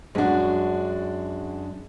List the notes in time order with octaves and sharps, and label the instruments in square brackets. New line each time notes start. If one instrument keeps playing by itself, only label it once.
[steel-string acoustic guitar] F#2 D4 [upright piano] G#3 F#4